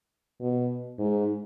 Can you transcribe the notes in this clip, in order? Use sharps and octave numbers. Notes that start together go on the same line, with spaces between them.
B2
G#2